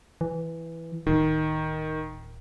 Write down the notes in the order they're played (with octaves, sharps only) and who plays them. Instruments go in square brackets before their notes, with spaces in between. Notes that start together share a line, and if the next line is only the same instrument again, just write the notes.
[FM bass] E3
[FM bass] D1 [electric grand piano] D#3